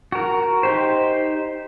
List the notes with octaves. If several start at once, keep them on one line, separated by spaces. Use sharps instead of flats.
F#4 A#4
D#4 G4 C5